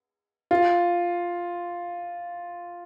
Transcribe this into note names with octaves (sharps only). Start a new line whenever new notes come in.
F4